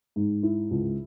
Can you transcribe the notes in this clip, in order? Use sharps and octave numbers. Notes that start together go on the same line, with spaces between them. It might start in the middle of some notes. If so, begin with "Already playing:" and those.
G#2
E4
C#2